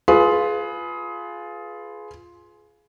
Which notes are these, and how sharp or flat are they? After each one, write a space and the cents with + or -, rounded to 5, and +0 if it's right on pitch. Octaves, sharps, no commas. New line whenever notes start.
F4 +0 G#4 +20 B4 +0